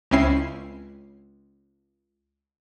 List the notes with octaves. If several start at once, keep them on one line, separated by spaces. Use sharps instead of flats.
C#2 C4 C#4 E4 C7